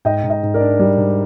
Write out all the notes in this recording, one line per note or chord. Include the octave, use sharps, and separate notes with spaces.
G#2 D#5 G5
G#2
D#5 G5
G#2
A#4 D5
D4
G3
G#2